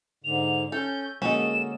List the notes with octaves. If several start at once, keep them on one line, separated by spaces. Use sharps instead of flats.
G#2 D3 F7
C#4 A4 G6
D3 G#3 A#3 C#4 F#4 A4 D#5 E7